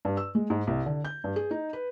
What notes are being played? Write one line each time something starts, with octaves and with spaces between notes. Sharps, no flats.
G2
E6
G#3
G#2
C2
D3
G6
G2
G#4
D#4
B4